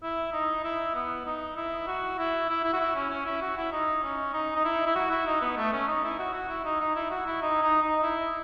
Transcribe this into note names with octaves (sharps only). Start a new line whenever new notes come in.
E4
D#4
E4
B3
D#4
E4
F#4
E4
E4
E4
F#4
E4
C#4
C#4
E4
F#4
E4
D#4
C#4
D#4
D#4
E4
E4
F#4
E4
D#4
B3
A3
C#4
D#4
E4
F#4
F#4
E4
D#4
D#4
E4
F#4
E4
D#4
D#4
D#4
E4